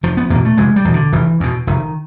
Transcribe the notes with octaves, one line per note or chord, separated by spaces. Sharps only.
F1 F3
B3
E2 B2 A#3
A3
F1 G#3
G3
E2 B2
D3
F1 E3
E2 B2
F1 D#3